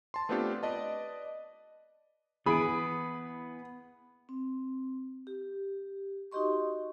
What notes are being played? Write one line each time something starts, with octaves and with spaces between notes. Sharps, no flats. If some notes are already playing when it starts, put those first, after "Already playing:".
A5 C6
A3 B3 C4 D4 F4 G4
B4 D5 D#5 A5
E3 B3 G#4 B5 D7
C4
G4
D#4 F#4 G4 D#5 C6 C#6